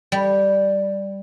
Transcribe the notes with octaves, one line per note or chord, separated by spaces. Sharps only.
G3